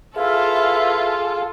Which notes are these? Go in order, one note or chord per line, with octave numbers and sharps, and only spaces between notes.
E4 F4 G#4 A4 B4 E5 F5